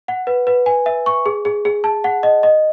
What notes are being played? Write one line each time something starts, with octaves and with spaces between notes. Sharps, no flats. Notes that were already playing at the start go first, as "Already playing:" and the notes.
F#5
B4
B4
G#5
E5
C#6
G#4
G#4
G#4
A5
F#5
D#5
D#5